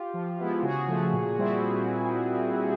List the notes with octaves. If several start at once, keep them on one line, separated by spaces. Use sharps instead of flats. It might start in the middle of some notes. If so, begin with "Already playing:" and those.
Already playing: F4 G4
F3
G#3 B3 E4
C#3 F#4 G#4
F3 A3
A#2
G3 C4 E4